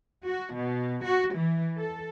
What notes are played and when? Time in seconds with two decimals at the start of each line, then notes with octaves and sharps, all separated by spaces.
0.25 F#4
0.55 B2
1.04 F#4
1.35 E3
1.78 A4